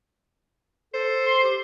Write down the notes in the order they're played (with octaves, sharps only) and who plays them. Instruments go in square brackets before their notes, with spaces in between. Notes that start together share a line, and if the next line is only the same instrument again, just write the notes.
[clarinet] A4 [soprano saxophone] C5
[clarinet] C6
G4